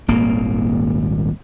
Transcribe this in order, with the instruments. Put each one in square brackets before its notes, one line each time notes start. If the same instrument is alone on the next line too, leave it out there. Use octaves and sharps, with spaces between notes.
[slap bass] D#1 G#1 A#3